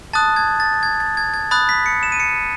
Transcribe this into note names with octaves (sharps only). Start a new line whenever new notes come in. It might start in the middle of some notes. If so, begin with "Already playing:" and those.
A5 D#6 F#6 A6
G#6
A6
G#6
A6
G#6
G#6
B5 D#6 F#6 A6
B6
C#7
E7
D#7
C#7